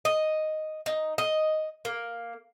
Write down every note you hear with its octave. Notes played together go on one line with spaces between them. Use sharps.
D#5
D#4
D#5
A#3